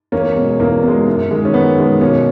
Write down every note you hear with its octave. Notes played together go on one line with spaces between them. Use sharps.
E2 A#3 C#4
B2 G#3
E2 A#3
B2 G#3
F#2
D#3 G#3
C#4
F#2 B3
D#3 G#3
B2 A#3 C#4